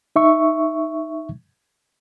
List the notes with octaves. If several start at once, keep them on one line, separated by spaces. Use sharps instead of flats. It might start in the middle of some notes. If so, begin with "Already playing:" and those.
D#4 E5 C#6